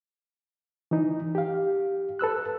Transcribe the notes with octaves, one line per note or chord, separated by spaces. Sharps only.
E3 D#4
G4 F5
A4 B4 E6 F#6